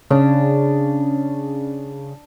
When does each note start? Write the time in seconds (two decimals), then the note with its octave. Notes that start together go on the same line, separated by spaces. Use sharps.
0.11 C#3 D4